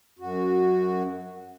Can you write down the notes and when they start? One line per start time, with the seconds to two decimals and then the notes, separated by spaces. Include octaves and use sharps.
0.19 F#2 F#4